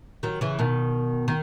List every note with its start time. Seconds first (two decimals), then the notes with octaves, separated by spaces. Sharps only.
0.23 D#3 F#3
0.41 C#3 E3
0.59 B2 D#3
1.28 D#3